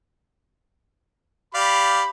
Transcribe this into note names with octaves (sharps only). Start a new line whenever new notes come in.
G4 D5 F5 B5